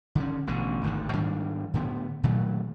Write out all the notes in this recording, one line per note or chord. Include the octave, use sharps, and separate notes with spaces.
D3 D#3 C#4
A1 B2 D3
G#1 D2 G#2 D#3
G#2 D#3 G3 D4
A2 D3 B3
A#2 D#3 F#3 A3